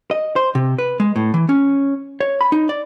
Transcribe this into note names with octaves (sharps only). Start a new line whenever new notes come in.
D#5
C5
C3
B4
G#3
A2
E3
C#4
C#5
B5
D#4
D5